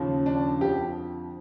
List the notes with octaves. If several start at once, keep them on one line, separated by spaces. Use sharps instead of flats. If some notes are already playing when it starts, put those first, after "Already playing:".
Already playing: D#2 C#3 F3
D4
F2 D3 F3 G4